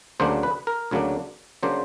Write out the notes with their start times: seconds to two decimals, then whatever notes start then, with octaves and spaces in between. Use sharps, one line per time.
0.20 D2 C#3 F#3 A#3 D4 C5
0.43 B4
0.67 A#4
0.91 D2 C#3 F#3 A#3 D4
1.63 C#3 F#3 A#3 D4 C5